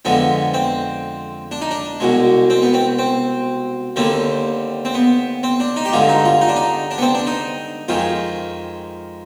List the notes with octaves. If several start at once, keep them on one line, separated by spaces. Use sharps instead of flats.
F2 D3 G#3 B3
C4
D4
D#4
D4
C2 B2 G#3
C4
B3
C4
C4
D#2 D3 G3 C4
C4
B3
C4
D4
D#4
G4
G2 D3 G#3 F4
D#4
F4
D#4
D4
D#4
D4
B3
C4
D4
D#4
F2 D#3 G#3 F4